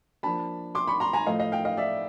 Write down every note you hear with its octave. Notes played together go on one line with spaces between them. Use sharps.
F3 A#3 D4 A5 B5
C6 D6
B5 C#6
A#5 C6
G#5 A#5
A2 F3 A3 D#5 F5
D#5 F5
F5 G5
D#5 F5
D5 E5